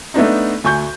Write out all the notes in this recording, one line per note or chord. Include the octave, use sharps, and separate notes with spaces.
A3 B3 D4 D#4
D2 G#5 C#6 G6